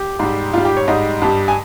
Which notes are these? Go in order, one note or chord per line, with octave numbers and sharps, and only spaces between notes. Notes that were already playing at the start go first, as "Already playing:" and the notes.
Already playing: G4
G#2 G3
G#2 G3 F4
G4
C#5
G#2 G3 D#5
G2 G3
G#5